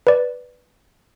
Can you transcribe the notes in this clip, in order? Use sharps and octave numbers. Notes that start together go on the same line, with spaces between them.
B4 D5